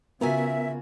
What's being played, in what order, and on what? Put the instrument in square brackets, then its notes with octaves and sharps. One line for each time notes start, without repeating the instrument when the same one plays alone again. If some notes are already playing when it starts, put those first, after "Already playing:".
[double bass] C#3 [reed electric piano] B3 A#4 [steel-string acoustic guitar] F4 F#4 G#5 [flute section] E5